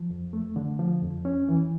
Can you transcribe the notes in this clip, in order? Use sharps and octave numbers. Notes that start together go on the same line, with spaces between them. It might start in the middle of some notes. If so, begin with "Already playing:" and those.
Already playing: F3
F2
A3
D3
F3
F2
C#4
E3